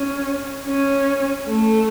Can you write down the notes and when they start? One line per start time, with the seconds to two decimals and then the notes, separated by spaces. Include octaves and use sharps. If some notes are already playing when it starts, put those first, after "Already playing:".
Already playing: C#4
0.66 C#4
1.48 A3